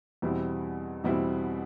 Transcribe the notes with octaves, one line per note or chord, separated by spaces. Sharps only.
E2 B2 G3 C4 E4
E2 B2 G3 C4 E4